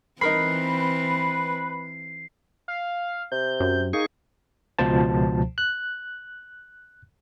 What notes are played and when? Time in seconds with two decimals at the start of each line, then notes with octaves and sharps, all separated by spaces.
0.21 E3 C4 D#4 A#4 B4 B5 C7
2.68 F5
3.32 C3 G6
3.60 F#2
3.93 A#3 D#4 G#4 C#6
4.79 C#2 B2 F3 C5 A5
5.58 F#6